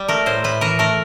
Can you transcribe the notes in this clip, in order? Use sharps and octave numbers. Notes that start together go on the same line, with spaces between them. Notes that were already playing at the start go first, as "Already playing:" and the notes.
Already playing: G3
A3 A#4
A2 C5
A2 B4
E3 A#4
A3 A#4